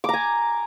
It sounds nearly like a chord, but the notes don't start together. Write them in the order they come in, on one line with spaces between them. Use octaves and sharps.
D6 A#5 G#5